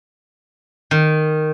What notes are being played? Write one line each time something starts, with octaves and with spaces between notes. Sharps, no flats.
D#3